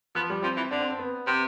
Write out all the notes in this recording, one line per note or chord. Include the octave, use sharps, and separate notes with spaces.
F3 B3
G3
F3 C4
E3
D3 D4
C4
C4
B3
C3 C4